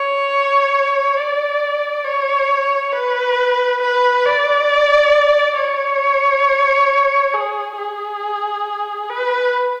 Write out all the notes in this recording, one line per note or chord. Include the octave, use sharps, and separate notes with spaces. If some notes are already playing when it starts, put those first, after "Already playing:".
Already playing: C#5
D5
C#5
B4
B4
D5
C#5
G#4
G#4
B4